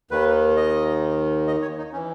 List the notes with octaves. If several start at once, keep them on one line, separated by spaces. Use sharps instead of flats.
D#2 D#3 B4
D#5
D#5
C#5
D#4
C#4
E3